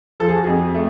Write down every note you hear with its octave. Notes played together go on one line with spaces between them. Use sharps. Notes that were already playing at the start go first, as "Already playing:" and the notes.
F3 A4
G#4
F#4
F2 G#4
A3